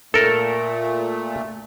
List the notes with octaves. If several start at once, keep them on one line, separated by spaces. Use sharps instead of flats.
A#2 A3 A4 A#4